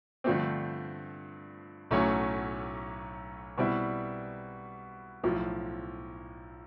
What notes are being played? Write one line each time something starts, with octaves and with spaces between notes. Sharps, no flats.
G2 D3 F3 A3 C4
B1 A2 F#3 A3 C#4
B2 G3 C4 E4
B1 A2 F3